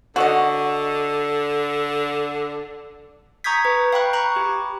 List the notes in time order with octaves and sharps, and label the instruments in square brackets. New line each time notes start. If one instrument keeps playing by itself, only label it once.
[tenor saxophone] D3 [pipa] F#4 D#5
[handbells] A#5 C#6 D#6 G6 G#6 B6
B4
F5 G5 B5 C#6 F#6
A#5 B5 C#6 F#6
G4